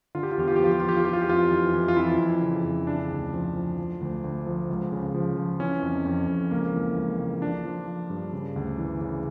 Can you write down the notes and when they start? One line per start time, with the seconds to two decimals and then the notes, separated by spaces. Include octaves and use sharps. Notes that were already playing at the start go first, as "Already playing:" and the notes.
0.15 D3 F4
0.23 G4
0.31 F4
0.38 E2 G4
0.48 F4
0.56 G4
0.60 F3 F4
0.72 G4
0.80 F3 F4
0.89 G4
0.97 F4
1.05 E3 G4
1.13 F4
1.22 G4
1.28 F2 F4
1.51 E3
1.74 E3
1.88 F4
1.96 F2 E4
2.19 F2
2.42 C#3
2.65 F2
2.87 C#3 D4
3.10 D2
3.33 F3
3.56 F3
3.78 F3
4.01 D2
4.24 D2
4.47 F3
4.70 C#2
4.92 C#3
5.14 F3
5.37 F3
5.60 E3 C#4
5.83 F2
6.06 F2
6.28 F2
6.51 C#2 A#3
6.74 E3
6.96 C#2
7.19 C#2
7.42 F3 D4
7.65 F3
7.88 F3
8.10 G2
8.33 C#3
8.56 D2
8.78 E3
9.01 C#3